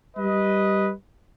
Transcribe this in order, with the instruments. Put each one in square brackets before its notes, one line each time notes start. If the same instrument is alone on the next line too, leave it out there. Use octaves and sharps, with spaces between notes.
[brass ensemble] G3 B4 D#5